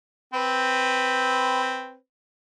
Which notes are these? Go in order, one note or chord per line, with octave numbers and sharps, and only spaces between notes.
C4 B4